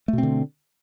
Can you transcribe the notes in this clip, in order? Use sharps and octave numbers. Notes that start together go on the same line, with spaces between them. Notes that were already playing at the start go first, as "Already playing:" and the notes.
B2 D3 A3 C4